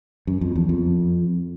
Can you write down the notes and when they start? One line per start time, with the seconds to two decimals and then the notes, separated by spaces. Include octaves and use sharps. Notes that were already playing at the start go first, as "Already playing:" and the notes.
0.27 F#2
0.41 F2
0.55 E2
0.69 F2